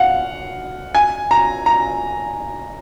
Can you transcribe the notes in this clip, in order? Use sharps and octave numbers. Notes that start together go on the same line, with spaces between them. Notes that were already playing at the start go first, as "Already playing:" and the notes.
Already playing: F5 F#5
G#5
A#5
A#5